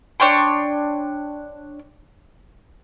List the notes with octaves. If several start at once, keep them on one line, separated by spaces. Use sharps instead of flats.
D4 C#5 G5 C6